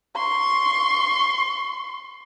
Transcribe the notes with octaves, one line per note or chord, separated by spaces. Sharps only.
C6 C#6